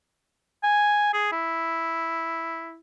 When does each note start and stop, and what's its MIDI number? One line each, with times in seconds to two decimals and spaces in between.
0.63 1.10 80
1.13 1.31 68
1.32 2.78 64